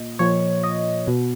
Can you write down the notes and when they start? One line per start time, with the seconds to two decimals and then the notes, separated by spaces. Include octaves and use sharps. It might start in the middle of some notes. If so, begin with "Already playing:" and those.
Already playing: A#2 D#5
0.19 A#2 F3 C#5
0.63 D#5
1.07 B2